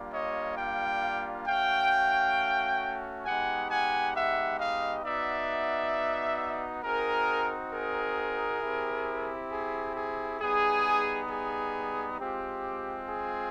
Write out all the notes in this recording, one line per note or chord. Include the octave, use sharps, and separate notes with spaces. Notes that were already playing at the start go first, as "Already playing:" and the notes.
Already playing: G3 A#3 D4 F4
C#5 D#5
F5 G5
A3 C#4 F#4 F5 G5
G#3 B3 D#4 G4 F#5 G#5
F#5 G#5
E5 F#5
D#5 F5
B3 D#4 F#4 D5 E5
C4 D#4 F#4 G#4 A#4
G#4 A#4
C4 E4 G4
G#4
G#4
G3 B3 D#4 G#4
G#4
G#3 C4 F4 G4
G#4